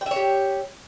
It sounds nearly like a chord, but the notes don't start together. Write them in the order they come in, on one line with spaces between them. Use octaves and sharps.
G5 E5 C#5 G4